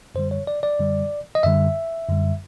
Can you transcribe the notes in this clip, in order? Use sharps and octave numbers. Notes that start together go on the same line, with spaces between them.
F#2 D3 G3 C5
C#5
D5
D5
F#2 D3 G3
D#5
F#2 D3 G3 E5
F#2 D3 G3